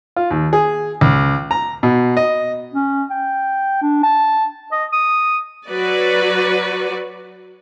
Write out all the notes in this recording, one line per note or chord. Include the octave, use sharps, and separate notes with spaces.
F4
D#2
G#4
C#2
A#5
B2
D#5
C#4
G5
D4
A5
D#5
D#6
F#3 F#4 B4 D5